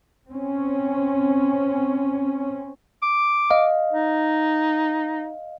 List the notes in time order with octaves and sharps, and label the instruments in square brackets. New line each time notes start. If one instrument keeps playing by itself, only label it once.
[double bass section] C4 C#4
[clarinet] D6
[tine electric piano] D#5 F5
[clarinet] D#4